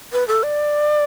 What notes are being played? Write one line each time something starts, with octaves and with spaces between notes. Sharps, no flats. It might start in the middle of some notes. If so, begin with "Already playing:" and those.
B4
A4
D5